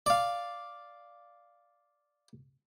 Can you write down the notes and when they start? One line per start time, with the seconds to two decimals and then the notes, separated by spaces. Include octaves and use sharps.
0.06 D5 F5